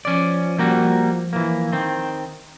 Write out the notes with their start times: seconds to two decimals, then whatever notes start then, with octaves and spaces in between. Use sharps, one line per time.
0.05 F3 C#4 D5
0.59 G3 A#3 F#4
1.33 E3 A#3
1.73 D#3 C4